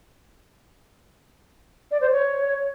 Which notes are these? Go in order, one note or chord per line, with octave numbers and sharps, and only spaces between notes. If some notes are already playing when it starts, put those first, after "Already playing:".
D5
C5
C#5